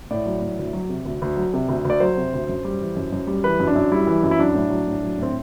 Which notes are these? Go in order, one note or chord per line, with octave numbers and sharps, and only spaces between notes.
A2 D5
F#3
A2
D2
F#3
C3
D2
D2
F#3
C3
D2
D2
D5
F#3 C5
C3
D2
F#2
G3
E3
F#2
F#2
G3
E3 B4
F#2
D4
F#2
G3 E4
E3
F#2
E4
F#3 D4
A2
F#3
A2
F#3
A2 C4